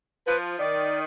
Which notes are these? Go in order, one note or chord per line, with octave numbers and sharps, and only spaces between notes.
F3 B4
D#3 D5